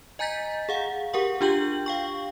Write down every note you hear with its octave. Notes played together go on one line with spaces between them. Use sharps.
D#5 G#5 A#5 G6 A6 B6
G#4 F5 F#5
G4 A#4 F#5 C#6
D4 F4 G4 G5 G6 F#7
F5 G5 C#6